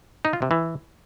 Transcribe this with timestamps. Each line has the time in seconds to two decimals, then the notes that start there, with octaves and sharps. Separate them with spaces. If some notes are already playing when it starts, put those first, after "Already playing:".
0.25 D#4
0.33 F4
0.42 C3
0.51 E3